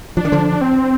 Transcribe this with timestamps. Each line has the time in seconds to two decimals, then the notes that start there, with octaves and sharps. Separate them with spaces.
0.17 F3 D4
0.25 D#3
0.32 D3 F3
0.61 C4